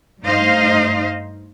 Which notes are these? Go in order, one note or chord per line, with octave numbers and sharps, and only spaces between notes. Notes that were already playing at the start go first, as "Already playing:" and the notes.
G2 A3 D#4 C5 D#5 F5